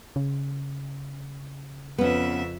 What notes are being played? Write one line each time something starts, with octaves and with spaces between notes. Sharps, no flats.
C#3
F2 B3 C#4 E5